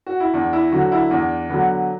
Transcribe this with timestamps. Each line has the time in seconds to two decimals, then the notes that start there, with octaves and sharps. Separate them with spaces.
0.06 F#4
0.20 E4
0.34 E2 D4
0.53 E4
0.72 D3 F#3 F#4
0.92 E4
1.11 E2 D4
1.50 D3 F#3 B3